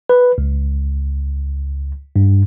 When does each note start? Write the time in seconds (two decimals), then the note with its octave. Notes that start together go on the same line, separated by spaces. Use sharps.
0.09 B4
0.38 C#2
2.16 G2